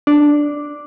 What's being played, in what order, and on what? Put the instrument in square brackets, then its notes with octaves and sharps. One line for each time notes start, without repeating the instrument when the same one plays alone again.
[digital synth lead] D4